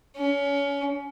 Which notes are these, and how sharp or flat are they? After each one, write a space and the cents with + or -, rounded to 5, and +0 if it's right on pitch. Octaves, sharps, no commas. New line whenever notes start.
C#4 +30